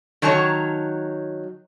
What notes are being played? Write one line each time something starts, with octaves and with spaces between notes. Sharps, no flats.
D#3 F#3 C#5 A5 A#5